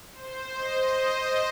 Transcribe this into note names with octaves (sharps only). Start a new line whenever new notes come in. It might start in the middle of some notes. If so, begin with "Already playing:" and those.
C5
D#5
D#5